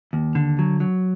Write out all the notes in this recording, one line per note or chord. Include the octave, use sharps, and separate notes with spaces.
D#2
D3
F#3
F#3